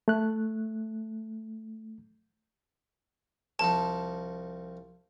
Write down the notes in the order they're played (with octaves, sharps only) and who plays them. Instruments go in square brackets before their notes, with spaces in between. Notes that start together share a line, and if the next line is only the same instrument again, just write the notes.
[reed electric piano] A3 F#6
[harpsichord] C2 F3 D#4 [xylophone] A5